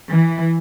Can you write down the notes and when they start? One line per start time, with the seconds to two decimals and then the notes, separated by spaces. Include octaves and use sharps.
0.10 E3